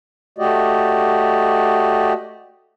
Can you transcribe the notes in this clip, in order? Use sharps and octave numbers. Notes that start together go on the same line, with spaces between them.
A3 F#4 G4 D5 D#5